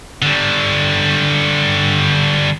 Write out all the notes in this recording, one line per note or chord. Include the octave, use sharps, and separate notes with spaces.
D3 G3